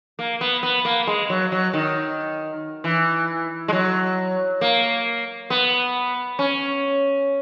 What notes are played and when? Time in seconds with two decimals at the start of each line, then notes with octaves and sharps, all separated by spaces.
0.19 A#3
0.41 B3
0.63 B3
0.85 A#3
1.07 G#3
1.30 F#3
1.52 F#3
1.73 D#3
2.84 E3
3.68 G#3
3.73 F#3
4.61 A#3
5.50 B3
6.39 C#4